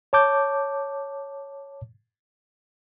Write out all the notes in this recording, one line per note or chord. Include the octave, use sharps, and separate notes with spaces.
C#5 A5 D6 G6